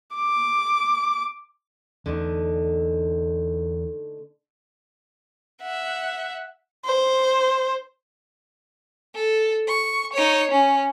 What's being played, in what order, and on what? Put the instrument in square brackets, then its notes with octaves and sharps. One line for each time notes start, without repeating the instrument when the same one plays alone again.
[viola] D6
[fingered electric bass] E2 [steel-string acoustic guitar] D3 A3 D#4
[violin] E5 F#5
C5
A4
C#6
D#4 C#5
C#4